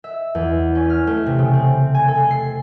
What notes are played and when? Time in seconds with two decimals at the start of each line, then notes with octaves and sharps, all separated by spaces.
0.04 E5
0.35 E2
0.75 C#4
0.90 F6
1.07 A3
1.26 C3
1.39 C#3
1.53 C4
1.94 G#5
2.08 A4
2.31 C7